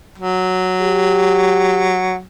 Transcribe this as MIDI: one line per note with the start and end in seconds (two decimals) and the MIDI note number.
0.18 2.21 54
0.82 1.96 67